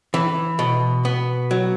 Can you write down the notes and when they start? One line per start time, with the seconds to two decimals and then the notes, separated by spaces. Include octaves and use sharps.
0.14 E3
0.59 B2
1.05 B3
1.51 F#3